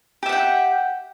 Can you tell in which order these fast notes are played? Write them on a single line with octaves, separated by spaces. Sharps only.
G4 E5 F#5 G5